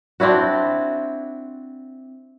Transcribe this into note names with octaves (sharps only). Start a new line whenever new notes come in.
C4 D4 E4 F#4